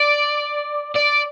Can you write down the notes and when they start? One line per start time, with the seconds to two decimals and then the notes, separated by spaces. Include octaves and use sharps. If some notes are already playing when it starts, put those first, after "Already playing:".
Already playing: D5
0.95 D5